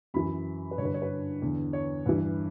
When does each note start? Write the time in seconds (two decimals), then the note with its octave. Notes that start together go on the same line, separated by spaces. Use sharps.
0.14 F#2 E3 B5
0.71 B4
0.78 G2 C#5
0.82 D3 B4
0.94 C#5
1.02 B4
1.42 E2 D3
1.73 C#5
2.06 G2 E3